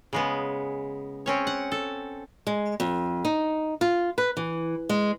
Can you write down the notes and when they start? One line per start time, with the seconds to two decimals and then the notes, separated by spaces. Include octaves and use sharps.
0.13 C#3 G#3 B3
1.26 C4 C#4 C#5
1.47 F#5
1.72 A4
2.47 G#3
2.80 F2
3.25 D#4
3.81 F4
4.18 B4
4.37 E3
4.89 G#3